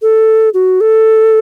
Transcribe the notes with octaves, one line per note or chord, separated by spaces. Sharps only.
A4
F#4
A4